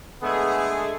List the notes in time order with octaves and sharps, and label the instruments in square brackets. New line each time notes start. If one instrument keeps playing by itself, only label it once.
[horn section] D3 G#3 A3 [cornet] B3 [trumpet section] G#4